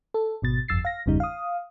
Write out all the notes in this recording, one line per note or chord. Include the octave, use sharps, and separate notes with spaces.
A4
G#1 B2 A6
G1 F2 E6 A6 C7
F5 A#6
G1 E2 C#3 G3 D#4
F5 D#6